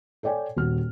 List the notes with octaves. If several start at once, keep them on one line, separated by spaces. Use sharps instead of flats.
A4 C#5 D5 G5 G#5
D#1 F#4 F6